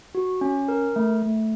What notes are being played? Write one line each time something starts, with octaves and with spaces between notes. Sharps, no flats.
F#4
C#4
A#4
A3
A3